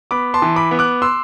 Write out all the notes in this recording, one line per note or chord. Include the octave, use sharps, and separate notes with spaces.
B3 B5 D6
A5 C6
E3
B5 D6
B3
D6 F#6
C6 E6